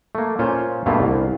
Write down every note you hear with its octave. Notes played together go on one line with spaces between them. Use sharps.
A3 A#3
A#2 C#4 F4 C5
G2 B2 A3 A#3 F4 E5
C2